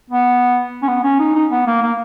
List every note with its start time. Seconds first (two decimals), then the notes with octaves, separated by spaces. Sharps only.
0.10 B3
0.83 C#4
0.88 B3
1.04 C#4
1.20 D#4
1.35 D#4
1.52 B3
1.67 A#3
1.83 A#3